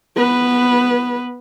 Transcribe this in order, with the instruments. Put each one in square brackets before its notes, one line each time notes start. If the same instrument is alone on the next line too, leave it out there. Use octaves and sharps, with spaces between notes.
[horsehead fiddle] B3 B4